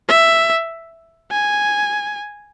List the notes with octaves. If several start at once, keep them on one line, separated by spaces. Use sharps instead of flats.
E5
G#5